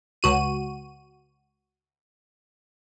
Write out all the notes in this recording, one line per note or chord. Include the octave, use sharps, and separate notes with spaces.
C#2 F#4 D#7